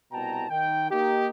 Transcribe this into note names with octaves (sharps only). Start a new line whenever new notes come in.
C2 B2 G5 A5 A#5
D#3 G5
A#3 D#4 G4